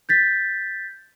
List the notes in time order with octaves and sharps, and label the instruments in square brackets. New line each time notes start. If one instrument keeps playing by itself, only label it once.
[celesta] G6 A6 B6